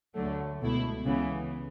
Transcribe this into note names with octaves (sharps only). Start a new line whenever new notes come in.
D2 D3 F#3 A3
C#2 B2 A3 E4
C#2 C#3 E3 B3